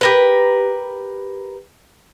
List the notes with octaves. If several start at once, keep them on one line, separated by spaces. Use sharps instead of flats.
G4 A#4 B4